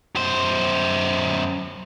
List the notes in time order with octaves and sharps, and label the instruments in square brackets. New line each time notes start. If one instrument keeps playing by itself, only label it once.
[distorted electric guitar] F#2 C5